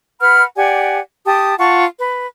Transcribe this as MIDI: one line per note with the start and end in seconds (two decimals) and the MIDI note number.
0.21 0.43 71
0.21 0.43 78
0.21 0.43 83
0.21 0.43 89
0.57 1.00 67
0.57 1.00 74
0.57 1.00 78
0.57 1.00 80
1.26 1.55 67
1.26 1.55 81
1.26 1.55 87
1.59 1.84 65
1.59 1.84 78
1.59 1.84 81
1.59 1.84 85
2.00 2.25 71